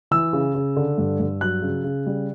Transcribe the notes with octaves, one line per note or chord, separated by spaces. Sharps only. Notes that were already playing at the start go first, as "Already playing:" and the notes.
E3 E6
C#3
C#3
D3
G2
G2
F#3 F#6
C#3
C#3
G3